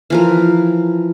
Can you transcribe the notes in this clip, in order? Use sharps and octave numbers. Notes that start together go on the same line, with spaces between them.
E3 F3 A#4